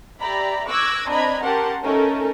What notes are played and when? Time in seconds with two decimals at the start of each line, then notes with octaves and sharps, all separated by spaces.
0.20 G4 D5 E5 A#5 B5
0.68 C#6 D6 E6 F#6 G#6 A#6
1.09 C4 D4 D#5 A#5 B5 G#6
1.44 C#4 G4 A#4 F#5 A5 C6
1.83 A3 C#4 D#4 A4 A#4